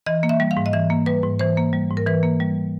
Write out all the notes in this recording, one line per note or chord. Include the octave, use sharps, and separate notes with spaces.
E3 D#5
A#3
E5
G3
F5
G#2
D#5
E3 E5
A#3
G3 B4
G#2
E3 C5
A#3
G3
G#2
A#4
E3 B4
A#3
G3